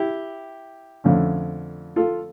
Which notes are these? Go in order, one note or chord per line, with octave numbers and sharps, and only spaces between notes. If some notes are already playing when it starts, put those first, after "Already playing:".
Already playing: E4 G4
F2 D3 A3 C#4
F4 A4